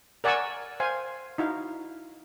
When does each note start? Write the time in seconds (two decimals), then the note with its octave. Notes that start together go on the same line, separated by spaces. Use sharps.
0.24 A#4 D5 F#5 G#5 C#6 E6
0.80 C5 F5 G#5
1.38 D#4 E4 F#4 F5